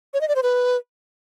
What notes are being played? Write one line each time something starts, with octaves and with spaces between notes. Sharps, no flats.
C#5
D#5
D5
C5
B4